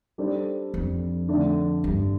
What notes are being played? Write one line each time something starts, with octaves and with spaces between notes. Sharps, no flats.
G3 D4 A4 C5
F2
D3 A3 D4
G2